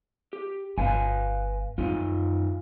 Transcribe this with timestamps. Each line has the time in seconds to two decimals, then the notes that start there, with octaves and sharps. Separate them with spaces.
0.33 G4
0.78 G1 B4 F5 G#5
1.78 F#2 D#3 D#4 F4